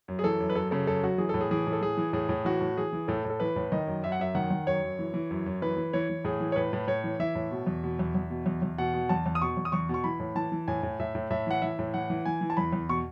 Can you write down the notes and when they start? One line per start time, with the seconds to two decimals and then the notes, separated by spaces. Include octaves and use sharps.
0.08 F#2
0.19 G#4
0.23 E3 A4
0.40 F#2
0.50 B4
0.55 F#2 A4
0.71 C#3 A4
0.87 F#2 A4
1.03 F#2 F#4
1.18 E3 G#4
1.29 A2 A4
1.40 G#4
1.51 E3 G#4
1.67 A2
1.73 A4
1.82 E3 G#4
1.97 E3
2.13 A2 G#4
2.29 A2
2.45 E3 F#4
2.61 A2
2.77 E3 G#4
2.93 E3
3.08 A2 A4
3.25 A2 A4
3.40 E3 B4
3.56 A2
3.72 D#3 D#5
3.87 F#2
4.03 F#2 E5
4.12 F#5
4.19 F#2 E5
4.35 D#3 F#5
4.50 D#3
4.67 F#2 C#5
4.82 F#2
4.99 E3
5.14 E3
5.31 F#2
5.46 F#2
5.62 E3 B4
5.77 E3
5.93 E3 C#5
6.10 E3
6.25 A2 G#4
6.41 E3
6.52 C#5
6.56 A2 B4
6.73 A2
6.87 A2 C#5
7.04 E3
7.20 E3 E5
7.35 A2
7.51 B2
7.67 E2
7.84 B2
7.99 E2
8.15 E2
8.30 B2
8.46 E2
8.62 E2
8.78 B2 F#5
8.94 B2
9.09 E2 A5
9.26 E2
9.35 D#6
9.41 B2 C#6
9.57 E2
9.65 D#6
9.72 E2 C#6
9.89 B2 C#6
10.04 E3 B5
10.20 A2
10.35 E3 A5
10.52 E3
10.68 A2 G#5
10.83 A2
11.00 A2 E5
11.15 A2
11.31 A2 E5
11.47 E3 F#5
11.62 E3 E5
11.79 A2
11.94 E3 F#5
12.10 E3
12.25 E3 G#5
12.41 E3
12.50 A5
12.57 E2 B5
12.73 E2
12.89 B2 C#6